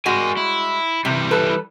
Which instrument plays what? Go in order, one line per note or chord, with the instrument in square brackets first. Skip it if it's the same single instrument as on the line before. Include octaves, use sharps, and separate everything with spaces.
[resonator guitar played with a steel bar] G3 G#3 F#4 [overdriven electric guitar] A#4 G#5
[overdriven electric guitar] E4
[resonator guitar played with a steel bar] C3 [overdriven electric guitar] E3 G3
[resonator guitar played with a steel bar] A4 B4